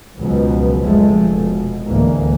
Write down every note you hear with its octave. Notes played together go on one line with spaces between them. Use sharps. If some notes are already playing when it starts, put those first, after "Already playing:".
C#2 B2 F3 F#3
F1 F3 G#3 A3
B2
A1 D2 E3 G#3 A#3